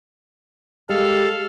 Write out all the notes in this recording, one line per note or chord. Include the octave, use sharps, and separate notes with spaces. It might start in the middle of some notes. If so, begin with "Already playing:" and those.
G#3 G4 A4 F5